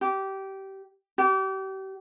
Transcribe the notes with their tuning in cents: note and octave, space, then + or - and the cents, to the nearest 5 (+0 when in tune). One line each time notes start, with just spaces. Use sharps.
G4 -20
G4 -35